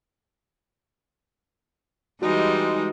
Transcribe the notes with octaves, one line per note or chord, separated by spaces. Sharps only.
E3 G3 G#3 D#4 F#4